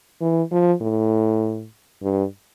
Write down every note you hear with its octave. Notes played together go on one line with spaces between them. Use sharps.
E3
F3
A2
G2